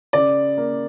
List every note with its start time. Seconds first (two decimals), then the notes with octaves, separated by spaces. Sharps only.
0.13 C#3 D5
0.57 A#3